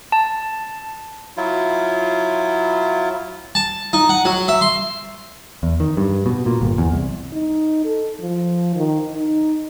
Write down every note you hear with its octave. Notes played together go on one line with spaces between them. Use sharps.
A5
F#3 E4 F4
A5
D#4
F#5
F#3
E5
C6
E2
D#3
G2
B2
A#2
G1
E2
C2
D#4
A4
F3
D#3
D#4